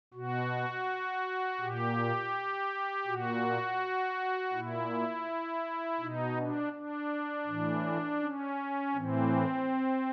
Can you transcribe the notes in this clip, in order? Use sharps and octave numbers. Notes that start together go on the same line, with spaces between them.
B2 F#4
A#2 G4
A#2 F#4
A#2 E4
B2 D#4
D4
D4
A2 E3
C#4
A2 E3 C4